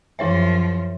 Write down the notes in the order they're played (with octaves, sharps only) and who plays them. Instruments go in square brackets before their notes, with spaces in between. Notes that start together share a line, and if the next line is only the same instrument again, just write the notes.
[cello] F#2 F3 [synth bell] E4 C#5 E5